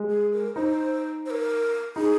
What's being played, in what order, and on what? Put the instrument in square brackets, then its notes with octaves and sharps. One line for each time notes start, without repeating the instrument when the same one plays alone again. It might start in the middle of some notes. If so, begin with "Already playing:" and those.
Already playing: [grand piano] G#3
[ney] G#4
A#4
[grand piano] D#4 [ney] C5
[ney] C5
A#4
[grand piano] D#4 [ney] G#4